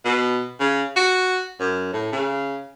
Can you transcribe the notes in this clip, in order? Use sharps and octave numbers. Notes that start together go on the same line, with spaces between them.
B2
C#3
F#4
F#2
A2
C#3